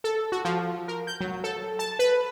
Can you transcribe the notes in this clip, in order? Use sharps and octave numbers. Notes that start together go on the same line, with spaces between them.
A4
F#4
F3
A#4
G6
F#3
A4
A5
B4